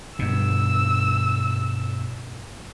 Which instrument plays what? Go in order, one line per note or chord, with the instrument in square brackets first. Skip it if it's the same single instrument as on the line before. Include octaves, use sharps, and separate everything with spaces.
[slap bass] G2 B2 [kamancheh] E6